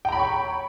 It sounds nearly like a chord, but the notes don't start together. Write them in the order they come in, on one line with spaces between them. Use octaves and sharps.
G5 A#5 B5 C#5 C#6